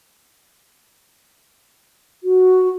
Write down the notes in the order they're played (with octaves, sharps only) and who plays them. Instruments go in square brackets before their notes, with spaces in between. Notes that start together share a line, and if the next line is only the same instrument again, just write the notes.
[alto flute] F#4